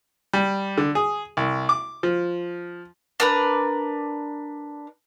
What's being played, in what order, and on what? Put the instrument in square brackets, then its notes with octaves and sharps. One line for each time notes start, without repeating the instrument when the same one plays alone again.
[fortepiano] G3
D3
G#4
C2
D6
F3
[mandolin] D4 A#4 B4